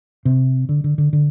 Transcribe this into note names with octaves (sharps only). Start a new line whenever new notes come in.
C3
D3
D3
D3
D3